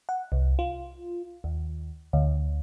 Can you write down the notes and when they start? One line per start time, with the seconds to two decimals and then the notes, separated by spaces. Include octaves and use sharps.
0.09 F#5
0.32 C2
0.59 F4
1.44 D#2
2.13 D2